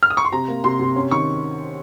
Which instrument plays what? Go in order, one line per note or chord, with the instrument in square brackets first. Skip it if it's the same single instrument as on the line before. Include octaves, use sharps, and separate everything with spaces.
[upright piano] F6
D#6
C#6
C6
C3 A#5
A#3
C3 C6
C3
C#4
D#3 C#6